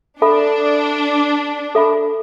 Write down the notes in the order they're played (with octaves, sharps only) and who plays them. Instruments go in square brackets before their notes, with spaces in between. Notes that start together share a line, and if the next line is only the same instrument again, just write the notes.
[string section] D4 [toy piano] A4 E5 B5
[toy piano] A4 E5 B5